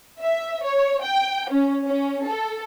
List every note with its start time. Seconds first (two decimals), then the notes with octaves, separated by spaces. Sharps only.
0.21 E5
0.64 C#5
1.03 G5
1.51 C#4
1.86 C#4
2.25 A4